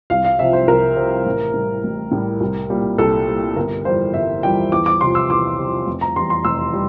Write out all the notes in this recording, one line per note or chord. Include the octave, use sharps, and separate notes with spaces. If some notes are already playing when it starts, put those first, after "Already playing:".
C2 F5
F5
C3 F3 E5
C5
C2 A#4
C3 F3
A1
A2 G3
A1
A2 G3
C2
A#2 G3
C2 A4
A#2 G3
G1 A#4
F2 E3 G3 C5
G1 E5
F2 E3 G3 G5
E2 D6
D6
C3 F3 C6
E6
E2 D6
C3 F3
F1
A#5
E2 E3 G3 C6
C6
F1 E6
G3